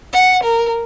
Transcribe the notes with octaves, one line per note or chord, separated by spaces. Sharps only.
F#5
A#4